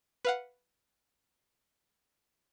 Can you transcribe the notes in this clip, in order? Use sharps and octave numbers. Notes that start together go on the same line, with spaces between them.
B4 F5 F#5